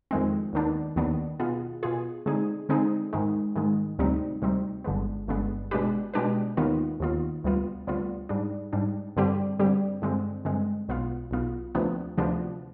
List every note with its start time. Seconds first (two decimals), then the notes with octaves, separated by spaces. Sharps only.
0.11 F2 D#3 G#3 C4
0.53 D#2 D#3 B3 D4
0.96 D#2 D#3 B3 D4
1.40 B2 B3 F4 G#4
1.83 B2 B3 F4 G#4
2.26 D3 G#3 C4 D#4 G#4
2.69 D3 G#3 C4 D#4 G#4
3.13 G#2 D#3 G#3
3.56 G#2 D#3 G#3
3.99 D2 C3 G3 C4 D#4
4.42 D2 C3 G3 C4 D#4
4.84 G1 G2 D3 G#3 B3
5.28 G1 G2 D3 G#3 B3
5.71 B2 G#3 D4 G4 B4
6.14 B2 G#3 D4 G4 B4
6.57 D#2 D#3 B3 F4
7.00 D#2 D#3 B3 F4
7.44 D2 C3 G3 B3 F4
7.87 D2 C3 G3 B3 F4
8.29 G#2 G3 D4
8.73 G#2 G3 D4
9.16 G2 D3 G3 C4 G4
9.59 G2 D3 G3 C4 G4
10.02 G2 D3 G#3 C4
10.45 G2 D3 G#3 C4
10.89 B1 B2 B3 F4
11.31 B1 B2 B3 F4
11.75 D2 C3 F3 B3 D4
12.18 D2 C3 F3 B3 D4